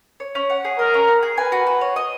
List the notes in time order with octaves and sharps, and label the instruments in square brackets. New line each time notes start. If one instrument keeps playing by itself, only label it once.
[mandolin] C#5
C#4
F#5
G#4
[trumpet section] A#4 [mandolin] D#5
[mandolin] C#4
F#5
G#4
[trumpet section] B4 [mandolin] G#5
[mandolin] F#4
F#4
C#5
D#5